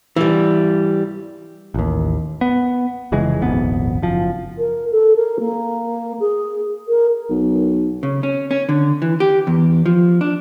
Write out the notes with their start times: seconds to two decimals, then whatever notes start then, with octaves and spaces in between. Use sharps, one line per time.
0.16 E3 G3
1.74 A1 D#2
2.41 B3
3.12 F1 C#3 E3 G#3
3.42 D#1 G#1 F2 B3
4.02 F#1 F3
4.58 A#4
4.91 A4
5.15 A#4
5.39 A#3
6.19 G#4
6.88 A#4
7.30 B1
8.03 C#3
8.23 C#4
8.51 C#4
8.69 D3
9.02 E3
9.20 G4
9.47 E2
9.86 F3
10.21 D4